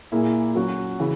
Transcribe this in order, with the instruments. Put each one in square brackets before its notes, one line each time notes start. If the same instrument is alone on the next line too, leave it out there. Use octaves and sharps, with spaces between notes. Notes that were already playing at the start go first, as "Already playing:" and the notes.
[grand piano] A#2 A#3 E4 G#4
F#3 C#4 F#4
C#3 E3